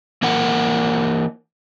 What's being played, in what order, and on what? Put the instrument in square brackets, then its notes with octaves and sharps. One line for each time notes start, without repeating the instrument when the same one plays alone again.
[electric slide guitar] E3 A#3 A#4 F#5